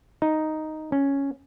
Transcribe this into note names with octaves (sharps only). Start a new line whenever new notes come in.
D#4
C#4